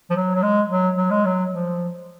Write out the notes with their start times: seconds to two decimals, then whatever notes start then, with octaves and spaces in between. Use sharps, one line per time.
0.10 F3
0.16 F#3
0.35 F#3
0.42 G#3
0.70 F#3
0.96 F#3
1.10 G#3
1.25 F#3
1.51 F3